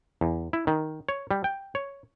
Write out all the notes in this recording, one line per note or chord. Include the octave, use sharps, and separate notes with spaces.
E2
E4
D#3
C#5
G3
G5
C#5